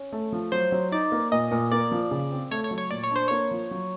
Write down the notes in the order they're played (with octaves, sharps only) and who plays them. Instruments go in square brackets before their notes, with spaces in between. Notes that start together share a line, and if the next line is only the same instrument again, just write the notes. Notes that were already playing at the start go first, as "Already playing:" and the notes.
Already playing: [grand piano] C#4
A3
F3
[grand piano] F#3 [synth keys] C5
[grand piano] F#3
[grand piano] D#4 [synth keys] D5
[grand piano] A#3
[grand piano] A#2 [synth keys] D#5
[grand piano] A#2
[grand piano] A#3 [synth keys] D5
[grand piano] F3
C#3
C4
[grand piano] A3 [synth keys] C#5
[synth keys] C#5
[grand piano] F#3
[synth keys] C#5
[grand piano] A#2 [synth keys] D5
[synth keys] C#5
[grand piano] D4 [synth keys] C5
[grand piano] A#3 [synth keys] C#5
[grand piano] F3
F#3